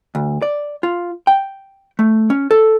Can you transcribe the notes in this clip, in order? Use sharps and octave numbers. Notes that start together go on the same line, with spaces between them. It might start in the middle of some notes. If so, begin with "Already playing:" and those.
D2
D5
F4
G5
A3
C#4
A4